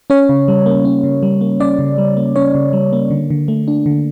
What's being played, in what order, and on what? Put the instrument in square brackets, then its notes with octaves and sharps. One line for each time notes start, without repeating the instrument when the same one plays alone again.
[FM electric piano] C#4 C#5
C#3
G3
A#3
C#4
C#3
G3
A#3
C#4 D5
C#3
G3
A#3
C#4 C#5
C#3
G3
A#3
D3
D3
A3
D4
D3